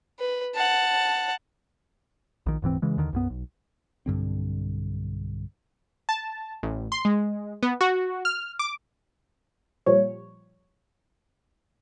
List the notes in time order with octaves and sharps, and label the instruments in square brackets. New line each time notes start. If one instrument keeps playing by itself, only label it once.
[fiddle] B4
F#5 A5
[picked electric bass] A#1 D#3
D#1 G#2 E3 C4
C#3 E3 G#3
D#2 D3 D#3
B1 F#2 B3
B1
B1 G2 D3 C4
[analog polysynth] A5
A1
C6
G#3
B3
F#4
F6
D6
[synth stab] A#2 F3 G3 C#5